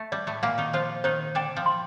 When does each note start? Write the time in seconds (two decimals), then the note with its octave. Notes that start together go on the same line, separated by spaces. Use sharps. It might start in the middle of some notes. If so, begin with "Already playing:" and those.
Already playing: A3
0.12 G3 D5
0.27 A2 A3
0.43 A#2 A#3 F5
0.58 D#3 D#4
0.73 F3 F4 C5
1.04 D#3 D#4 C5
1.35 D3 D4 G5
1.56 F3
1.66 C6